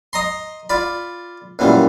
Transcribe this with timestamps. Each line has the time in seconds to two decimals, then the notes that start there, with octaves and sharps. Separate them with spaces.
0.13 D#5 A#5 C6
0.69 F4 D5 B5
1.59 F#2 A#2 E3 G3